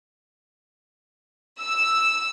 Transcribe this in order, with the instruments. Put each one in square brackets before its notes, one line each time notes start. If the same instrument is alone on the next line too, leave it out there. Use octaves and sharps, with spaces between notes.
[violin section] E6